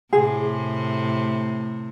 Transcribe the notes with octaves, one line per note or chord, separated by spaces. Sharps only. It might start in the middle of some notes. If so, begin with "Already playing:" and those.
A2 C3 G#4